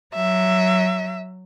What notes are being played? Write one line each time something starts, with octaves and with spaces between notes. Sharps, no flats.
F#3 E5